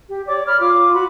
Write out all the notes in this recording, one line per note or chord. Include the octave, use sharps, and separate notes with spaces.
G4
C#5 D5 D6
C#5 B5 F6
F4 D6
F#4 B5